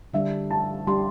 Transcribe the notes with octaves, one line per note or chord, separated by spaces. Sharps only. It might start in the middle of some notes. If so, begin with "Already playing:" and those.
D3 G3 D4 E5
A5
G3 D4 G4 C6